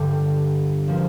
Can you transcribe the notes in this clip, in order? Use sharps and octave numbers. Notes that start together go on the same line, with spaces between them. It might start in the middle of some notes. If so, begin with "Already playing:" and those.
Already playing: G2 D3 G3
F3 A#3